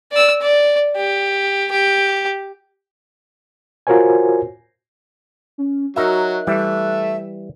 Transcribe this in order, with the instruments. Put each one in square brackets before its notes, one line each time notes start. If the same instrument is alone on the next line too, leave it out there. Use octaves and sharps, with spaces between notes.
[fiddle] D5 E6
D5
G4
G4
[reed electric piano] F4 F#4 A#4 C5 C#5 G#5
[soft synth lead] C#4
[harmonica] F#3 [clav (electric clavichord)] D#4 A#4 E5 [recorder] F#4 [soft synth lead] F#6
[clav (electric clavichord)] E3 G3 [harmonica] A3 [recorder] E5